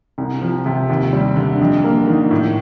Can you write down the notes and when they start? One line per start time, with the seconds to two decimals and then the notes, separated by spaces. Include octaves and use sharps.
0.18 C2
0.41 F3
0.66 C3
0.90 D#2
1.13 G3
1.36 D3
1.60 F2
1.84 A#3
2.07 D#3
2.31 A2